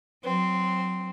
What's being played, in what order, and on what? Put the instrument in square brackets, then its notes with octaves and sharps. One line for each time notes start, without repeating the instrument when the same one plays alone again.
[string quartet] F#3 C4